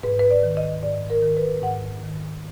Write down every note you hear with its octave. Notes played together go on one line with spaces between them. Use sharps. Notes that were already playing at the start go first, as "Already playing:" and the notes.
G#2 B4
B4
D5
D#3
D#5
G#2 D5
A#4
D#3
B4
G#2 F#5
D#3